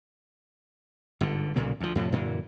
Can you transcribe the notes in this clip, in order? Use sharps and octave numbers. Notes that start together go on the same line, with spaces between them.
G1 G#2 D3
B1 A#2 C#3 A#3
D2 F3
F2 A2 C3 F3
F#2 A#2 D3 E3